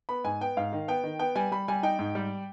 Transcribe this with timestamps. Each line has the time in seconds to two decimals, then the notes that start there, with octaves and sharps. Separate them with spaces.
0.09 B3 B5
0.24 G#2 G#5
0.41 B3 G5
0.57 G#2 F5
0.72 D#3
0.88 B3 G5
1.04 D#3
1.19 B3 G5
1.35 G3 G#5
1.52 G3 B5
1.68 G3 G#5
1.83 D#4 G5
1.99 G#2
2.15 G3